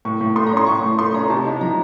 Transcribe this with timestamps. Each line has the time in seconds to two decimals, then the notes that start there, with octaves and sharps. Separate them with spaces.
0.05 A2 C#6
0.21 A2
0.35 A3 C6
0.47 A#5
0.52 C#4 C6
0.67 A2 C#6
0.83 A2
0.99 A3 C6
1.14 C#4 A#5
1.30 C3 A5
1.45 D#4
1.61 F3 A#5